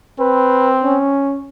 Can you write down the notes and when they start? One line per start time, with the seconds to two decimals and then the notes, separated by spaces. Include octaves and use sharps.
0.19 C4 B4
0.84 C#4